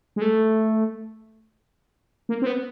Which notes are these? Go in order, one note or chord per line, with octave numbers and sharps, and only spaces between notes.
G#3
A3
A#3
C4
B3